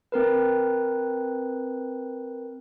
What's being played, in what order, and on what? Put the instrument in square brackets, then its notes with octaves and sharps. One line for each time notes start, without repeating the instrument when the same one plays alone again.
[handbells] C4 A#4 B4